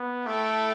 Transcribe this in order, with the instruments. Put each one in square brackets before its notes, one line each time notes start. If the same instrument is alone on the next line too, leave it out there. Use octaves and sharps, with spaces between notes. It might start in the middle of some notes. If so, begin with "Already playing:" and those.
Already playing: [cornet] B3
[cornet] A3 [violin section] E4 A4 E5 G5